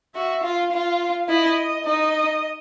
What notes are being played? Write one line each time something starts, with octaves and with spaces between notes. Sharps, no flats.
F#4 E5
F4 F5
F4
E4 D#5
D#4 D#5